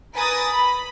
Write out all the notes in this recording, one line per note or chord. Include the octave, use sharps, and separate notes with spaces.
A#4 B4 G#5 D#6 A6 A#6
B5